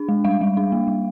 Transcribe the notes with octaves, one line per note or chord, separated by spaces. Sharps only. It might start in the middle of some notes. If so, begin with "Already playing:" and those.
Already playing: D4
G#3
G3 F5
G3
D4
A#3
G3